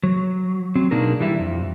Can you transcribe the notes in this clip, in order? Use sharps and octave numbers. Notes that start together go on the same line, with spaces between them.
F#3
F#3 C4
B2 A#3 D4 D#4 G#4 A#4
E3 G3 E4
F2